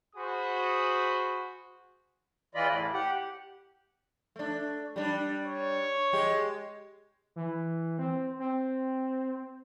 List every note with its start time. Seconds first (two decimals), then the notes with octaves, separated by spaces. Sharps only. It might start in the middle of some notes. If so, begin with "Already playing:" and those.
0.15 F#4 G#4 C5 B5 D#6
2.55 E2 E3 F4 D5 D#5 B5
2.68 A2
2.94 G4 F#5
4.36 A3 D4
4.96 G3 D4
5.46 C#5
6.13 G#3 G4
7.36 E3
7.99 C4
8.39 C4